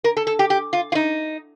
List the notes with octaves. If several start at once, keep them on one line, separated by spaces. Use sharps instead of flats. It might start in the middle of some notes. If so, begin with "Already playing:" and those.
A#4
A4
A4
G4
G4
F4
F4
D#4